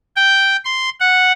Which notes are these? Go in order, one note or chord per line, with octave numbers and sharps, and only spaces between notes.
G5
C6
F#5